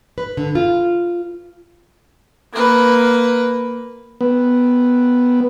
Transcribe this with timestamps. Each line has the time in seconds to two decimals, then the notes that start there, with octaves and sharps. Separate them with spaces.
0.18 B4
0.37 D3
0.55 F4
2.53 A#3 B4
4.21 B3